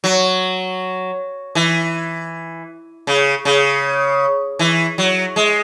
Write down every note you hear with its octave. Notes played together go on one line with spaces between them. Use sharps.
F#3
E3
C#3
C#3
E3
F#3
G#3